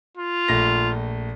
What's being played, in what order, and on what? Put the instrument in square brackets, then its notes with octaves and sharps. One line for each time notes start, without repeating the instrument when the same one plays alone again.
[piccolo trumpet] F4
[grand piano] A#1 A3 A#6